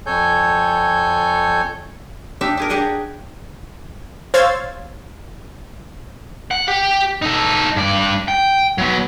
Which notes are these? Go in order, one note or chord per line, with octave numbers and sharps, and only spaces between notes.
F2 A4 C#5 G#5 G6
D4 D#4 G4 E5
D4 G#4 A#4
D4 G4 G#4 D#5 F#5
C5 C#5 F5 E6 G#6 A6
F#5
G4
D#4 A4
G2 D5
G5
F#3 B3